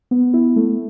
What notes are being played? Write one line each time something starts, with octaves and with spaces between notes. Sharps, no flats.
B3
E4
A3